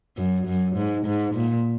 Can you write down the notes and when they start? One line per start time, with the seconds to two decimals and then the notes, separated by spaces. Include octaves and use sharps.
0.18 F#2
0.47 F#2
0.76 G#2
1.06 G#2
1.35 A#2